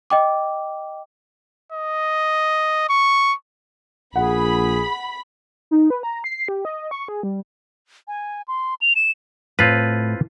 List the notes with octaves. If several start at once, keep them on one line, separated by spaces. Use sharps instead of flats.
D#5 G5 D6
D#5
C#6
A#1 G#4 F#5 B5
D#4
B4
A#5
C7
G4
D#5
C#6
G#4
G3
G#5
C6
F7
E7
A2 C4 F4 B4